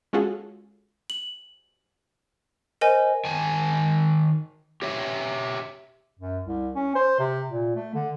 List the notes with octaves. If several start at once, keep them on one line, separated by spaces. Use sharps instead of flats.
G#3 C#4 F4 F#4 G#4 A4
F#7
A#4 C5 D#5 G#5
D#3 G#5 A5
G4 C#5 E5
F#2
C2
C#4
C5
C3
A#2
A3
D3